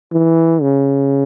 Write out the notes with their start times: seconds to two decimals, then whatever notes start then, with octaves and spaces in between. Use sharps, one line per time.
0.12 E3
0.61 C#3